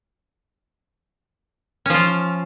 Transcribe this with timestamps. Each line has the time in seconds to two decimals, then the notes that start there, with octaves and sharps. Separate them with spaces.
1.86 C#4
1.90 F3
1.94 F4